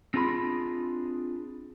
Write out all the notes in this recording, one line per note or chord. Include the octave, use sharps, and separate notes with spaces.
C4 D4 F4 G#4 B5 C6